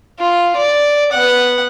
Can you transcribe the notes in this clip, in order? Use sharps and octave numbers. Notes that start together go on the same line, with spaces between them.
F4
D5
B3 F#5